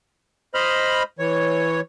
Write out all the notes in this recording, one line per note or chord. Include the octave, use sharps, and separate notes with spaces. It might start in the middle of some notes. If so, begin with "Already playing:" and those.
C5 D#5 B5 F6
E3 C#5